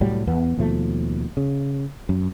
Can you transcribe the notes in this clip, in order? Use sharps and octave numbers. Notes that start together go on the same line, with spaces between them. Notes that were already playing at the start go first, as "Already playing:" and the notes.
C2 A2 F#3 G3
E2 B3
D#2 B2 F3 A3
C#3
F#2